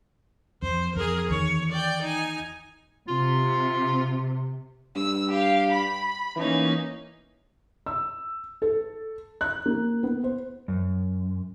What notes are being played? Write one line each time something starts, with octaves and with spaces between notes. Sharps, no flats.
F2 C5
F2 G#4 A#4
E2 D#3 C#5
D5 G5
D#4 G#5
C3 F4
G2 E6
G4 F5
B5
E3 A#3 C#4 D#4
E6
A4
F#6
A#3
B3
C5
F#2